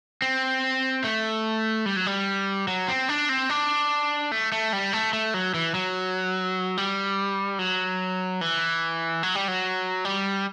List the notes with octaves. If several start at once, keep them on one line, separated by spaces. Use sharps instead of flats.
C4
A3
G3
F#3
G3
F#3
C4
D4
C4
D4
A3
A3
G3
A3
A3
F#3
E3
F#3
G3
F#3
E3
F#3
G3
F#3
G3